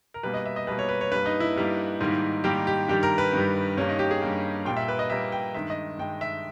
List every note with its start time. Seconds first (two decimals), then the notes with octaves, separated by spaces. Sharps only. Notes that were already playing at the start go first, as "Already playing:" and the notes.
0.14 A#4
0.23 B2 G3 A#3 B4
0.34 D#5
0.46 E5
0.56 D#5
0.67 B2 G3 A#3 B4
0.79 C#5
0.89 B4
1.01 C#5
1.11 G2 G3 A#3 B4
1.26 D#4
1.40 E4
1.56 G2 G3 A#3
2.01 G#2 D#3 G3 A#3
2.44 G#2 D#3 G3 A#3 G4
2.67 G4
2.88 G2 D#3 G3 G4
3.03 A#4
3.18 B4
3.33 G2 D#3 G3
3.77 G2 G3 A#3 C#4
3.89 D#4
3.99 G4
4.11 G#4
4.22 G2 G3 A#3
4.65 A#2 G3 A#3 G5
4.77 E5
4.88 B4
4.99 D#5
5.10 A#2 G3 A#3 E5
5.32 G5
5.54 G2 D#3 G#3 E5
5.70 D#5
5.98 G2 D#3 G#3 G5
6.21 E5